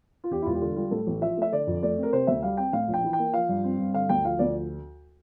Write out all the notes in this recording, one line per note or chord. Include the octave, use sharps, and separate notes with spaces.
F4
E2 G4
E4
E1 F4
G4
D3 F4
G3 F4
A2 A4
A1
F3 E5
A3 E5
D3 D5
F2
A3 D5
C4
A#4
C3 C5
D2 E5
G3 F5
C4 G5
A2 F5
A#1
G5
E3
G5
A#3
F3 F5
G2
C4
G2
D3 F5
D2 G5
F3 F5
D2 D5